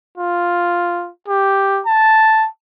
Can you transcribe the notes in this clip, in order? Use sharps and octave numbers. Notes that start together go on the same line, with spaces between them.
F4
G4
A5